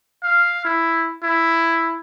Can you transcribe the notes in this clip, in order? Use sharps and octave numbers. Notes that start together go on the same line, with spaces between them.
F5
E4
E4